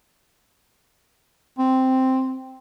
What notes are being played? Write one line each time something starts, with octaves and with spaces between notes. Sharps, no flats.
C4